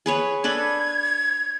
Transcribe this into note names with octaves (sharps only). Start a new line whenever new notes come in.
G#4 B4 C#5
D4 A4 B4 G#6